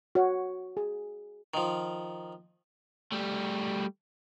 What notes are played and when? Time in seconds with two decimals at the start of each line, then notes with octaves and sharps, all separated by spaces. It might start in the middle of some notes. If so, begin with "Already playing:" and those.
0.15 F#4 C#5
0.77 G#4
1.54 D#3 F3
3.12 G3 A3